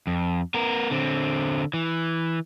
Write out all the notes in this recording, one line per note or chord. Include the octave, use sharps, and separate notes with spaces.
F2
B3 A#4
D3 C4
E3